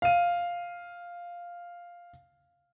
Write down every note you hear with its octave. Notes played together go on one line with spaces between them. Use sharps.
F5 D#7